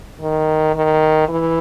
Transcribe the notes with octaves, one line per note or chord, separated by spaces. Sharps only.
D#3
D#3
E3